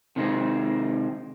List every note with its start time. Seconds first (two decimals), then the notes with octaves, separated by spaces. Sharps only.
0.16 C3 D#3 G#3 C4